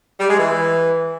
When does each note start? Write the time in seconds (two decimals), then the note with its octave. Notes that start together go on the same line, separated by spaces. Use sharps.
0.20 G3
0.29 G#3
0.39 E3